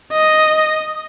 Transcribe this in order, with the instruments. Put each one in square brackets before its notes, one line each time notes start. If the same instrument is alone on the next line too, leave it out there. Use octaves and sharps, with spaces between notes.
[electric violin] D#5